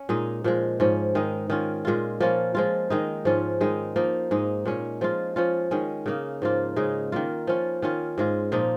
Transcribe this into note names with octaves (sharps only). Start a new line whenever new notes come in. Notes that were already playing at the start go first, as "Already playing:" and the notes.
Already playing: C#4
A#2 G#3 D#4
A#2 F3 G#3
G#2 F3 C#4
D#3 G#3 D#4
D#3 C#4 F4
A#2 G#3 F4
F3 A#3 C#4 F4
F3 G#3 F4
D#3 G#3 D#4
G#2 F3 C#4 F4
D#3 G#3 D#4
F3 A#3 D#4
G#2 G#3 D#4
A#2 G#3 C#4
F3 G#3 F4
F3 C#4 F4
D#3 G#3 C#4
C#3 A#3 D#4
G#2 F3 A#3 F4
C#3 G#3 D#4
D#3 A#3 F4
F3 C#4 F4
D#3 C#4 F4
G#2 G#3 F4
A#2 F3 A#3 D#4